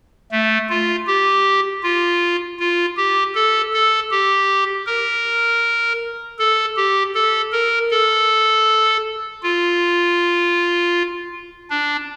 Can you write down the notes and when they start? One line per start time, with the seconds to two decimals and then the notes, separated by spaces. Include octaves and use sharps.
0.31 A3
0.69 F4
1.07 G4
1.83 F4
2.59 F4
2.97 G4
3.35 A4
3.73 A4
4.11 G4
4.87 A#4
6.39 A4
6.77 G4
7.15 A4
7.52 A#4
7.91 A4
9.43 F4
11.70 D4